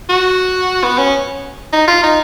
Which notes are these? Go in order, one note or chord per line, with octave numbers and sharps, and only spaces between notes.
F#4
B3
C#4
D#4
F4
D#4